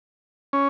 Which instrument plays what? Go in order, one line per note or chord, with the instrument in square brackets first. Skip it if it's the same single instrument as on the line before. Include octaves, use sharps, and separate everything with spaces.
[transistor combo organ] C#4